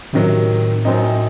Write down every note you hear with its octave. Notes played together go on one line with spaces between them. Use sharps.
A2 C3 D#3 F#3
F#2 F#3 C4 D#4